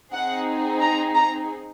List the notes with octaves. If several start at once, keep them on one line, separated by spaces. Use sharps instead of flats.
C4 D#4 G#4 F#5
A#5
A#5